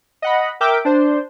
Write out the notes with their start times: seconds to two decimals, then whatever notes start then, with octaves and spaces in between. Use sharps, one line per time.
0.22 D#5 F#5 B5
0.61 A#4 E5 G5 D6
0.85 D4 C5